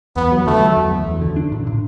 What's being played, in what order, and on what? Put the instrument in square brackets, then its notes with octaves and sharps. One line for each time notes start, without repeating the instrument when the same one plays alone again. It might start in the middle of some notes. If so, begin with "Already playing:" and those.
[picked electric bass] E2 [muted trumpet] B3
[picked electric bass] F#3
[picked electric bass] D3 [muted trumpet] A3
[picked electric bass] F#3
E2
E2
E2
D3
D4
A2
A2